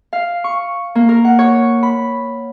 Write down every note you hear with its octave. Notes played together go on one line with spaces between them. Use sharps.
F5
C#6
A#3
A#4
F#5
C#5
B5